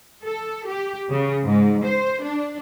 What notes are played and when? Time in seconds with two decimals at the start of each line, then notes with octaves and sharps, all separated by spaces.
0.23 A4
0.66 G4
1.10 C#3
1.44 G#2
1.85 C5
2.23 D4